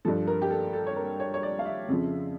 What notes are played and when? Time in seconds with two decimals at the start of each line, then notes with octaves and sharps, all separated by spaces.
0.05 G2 F3 A4
0.27 A#4
0.42 G4
0.51 A4
0.73 A4
0.87 C#5
0.96 A#4
1.20 C#5
1.34 C#5
1.43 D5
1.59 F5
1.65 E5
1.89 F2 C#3 F3